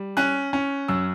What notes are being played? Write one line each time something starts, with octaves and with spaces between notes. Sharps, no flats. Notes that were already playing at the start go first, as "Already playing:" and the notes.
Already playing: G3
C#4 F#6
C#4
F#2 E6